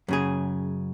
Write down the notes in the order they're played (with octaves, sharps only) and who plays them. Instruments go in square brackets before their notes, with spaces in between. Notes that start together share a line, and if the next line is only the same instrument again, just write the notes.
[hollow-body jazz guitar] F#2 C#3 G#4